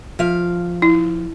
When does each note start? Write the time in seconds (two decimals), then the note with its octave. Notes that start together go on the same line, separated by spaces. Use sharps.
0.19 F3 F5
0.82 E4